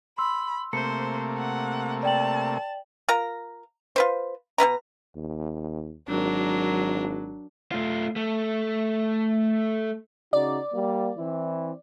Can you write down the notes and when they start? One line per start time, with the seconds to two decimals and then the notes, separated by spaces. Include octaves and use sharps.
0.18 B5 C6 E6
0.73 C3 A3 A#3 C5 C#7
1.38 F#5
2.03 D5 G5 A5 F#7
3.09 F4 A#4 A#5
3.96 F4 B4 C5
4.58 B2 F4 B4 A#5
5.16 D#2
6.08 G#1 F#3 D4 A#4
7.72 A3 F4
8.16 A3
10.33 C#3 D#4 F#4 D5
10.74 G3 A#3
11.17 E3 C4 E4